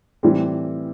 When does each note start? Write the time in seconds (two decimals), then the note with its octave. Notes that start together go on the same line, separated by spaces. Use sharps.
0.23 A2 E3 G3 C4 G4